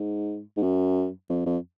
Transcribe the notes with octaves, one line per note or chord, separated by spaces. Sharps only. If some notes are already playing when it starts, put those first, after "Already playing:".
Already playing: G#2
G#2
F#2
F2
F2